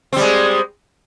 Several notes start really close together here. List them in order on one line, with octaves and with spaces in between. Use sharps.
C4 G3 G#3